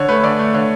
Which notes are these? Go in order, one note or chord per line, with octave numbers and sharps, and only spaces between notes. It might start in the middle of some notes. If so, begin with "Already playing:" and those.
Already playing: D3 C#5
A3 B4
D3 D5
A3
D3 C#5